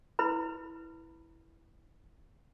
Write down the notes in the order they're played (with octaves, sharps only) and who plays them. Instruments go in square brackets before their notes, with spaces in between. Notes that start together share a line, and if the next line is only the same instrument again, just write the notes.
[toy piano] E4 B4 B5